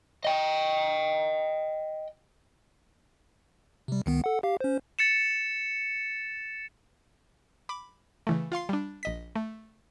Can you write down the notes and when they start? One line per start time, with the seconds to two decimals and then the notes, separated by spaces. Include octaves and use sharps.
0.25 D#5 G5
3.88 C3 G3
4.06 C#2 D#3 B3
4.24 A4 F#5
4.43 G4 F5
4.61 C#4 C5
4.99 A6 C#7 E7
7.69 B5 D6
8.27 C#3 E3 A3
8.52 F4 F5 C6 C7
8.69 G3 D4
9.03 A#1 D#5 B6
9.36 A3